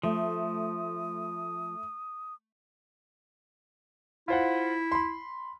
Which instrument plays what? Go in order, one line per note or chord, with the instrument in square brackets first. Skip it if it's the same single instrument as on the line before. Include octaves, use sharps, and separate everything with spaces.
[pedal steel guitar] F3 [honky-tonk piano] A3 [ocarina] D#6
[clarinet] E4 [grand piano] F4 C5 F#5
[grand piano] B5 C6